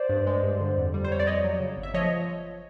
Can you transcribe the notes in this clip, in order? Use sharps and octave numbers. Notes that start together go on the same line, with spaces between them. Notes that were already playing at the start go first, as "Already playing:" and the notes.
Already playing: C5 D5
G2
G#3
G2
D3
F2
G3
C5
F2 C#5
D5
F2 C#5 D#5
F#3
C#3
G1
E5
F3 C#5 D#5